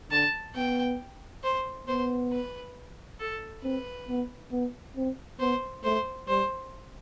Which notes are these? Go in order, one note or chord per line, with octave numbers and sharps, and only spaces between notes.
D3 A5
B3 G5
C5
B3 C5
B4
A4
C4 B4
B3
B3
C4
B3 C5
A3 C5
G3 C5